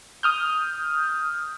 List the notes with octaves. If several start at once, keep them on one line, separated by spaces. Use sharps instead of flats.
D#6 F6 G6